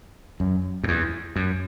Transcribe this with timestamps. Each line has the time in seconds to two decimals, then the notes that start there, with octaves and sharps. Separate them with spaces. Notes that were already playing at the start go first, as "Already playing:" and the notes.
0.40 F#2
0.84 F#2
0.88 E2
1.36 F#2